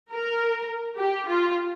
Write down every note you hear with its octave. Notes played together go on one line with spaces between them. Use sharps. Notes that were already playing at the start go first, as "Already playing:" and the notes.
A#4
G4
F4